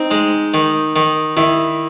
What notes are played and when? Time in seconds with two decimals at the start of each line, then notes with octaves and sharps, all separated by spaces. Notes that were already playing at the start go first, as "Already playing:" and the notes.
Already playing: C4 D#4
0.11 G#3
0.54 D#3
0.96 D#3
1.37 D#3 E4